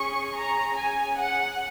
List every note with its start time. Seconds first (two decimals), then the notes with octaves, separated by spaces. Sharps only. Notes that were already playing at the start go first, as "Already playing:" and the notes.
Already playing: C#4 G#4 C#6
0.36 A#5
0.76 G#5
1.17 F#5